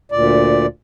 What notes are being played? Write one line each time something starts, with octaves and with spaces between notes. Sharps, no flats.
D2 A#2 D5